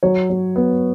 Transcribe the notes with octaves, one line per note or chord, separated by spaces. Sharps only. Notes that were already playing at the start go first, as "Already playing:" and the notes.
F#3 C#5
F#3
B3